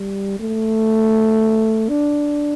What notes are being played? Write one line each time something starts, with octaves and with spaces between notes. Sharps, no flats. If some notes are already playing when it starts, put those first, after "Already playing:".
Already playing: G3
A3
D4